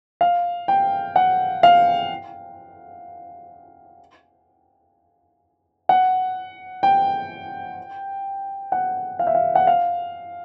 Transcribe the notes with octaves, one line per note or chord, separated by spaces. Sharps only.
F5
G5
F#5
F5
F#5
G5
F#5
F5
E5
F5
F#5
F5